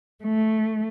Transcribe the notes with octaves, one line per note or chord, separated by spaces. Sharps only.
A3